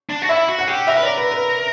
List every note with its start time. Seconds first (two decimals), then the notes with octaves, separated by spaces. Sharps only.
0.10 D4
0.22 F#4
0.29 E4 E5
0.48 F#4
0.59 F#5
0.68 G4
0.87 A#4 E5
0.97 B4
1.03 A#4 D5
1.18 B4
1.31 B4